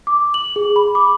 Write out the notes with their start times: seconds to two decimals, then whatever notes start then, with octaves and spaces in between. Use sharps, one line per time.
0.07 D6
0.34 F#7
0.56 G#4
0.76 B5
0.95 D6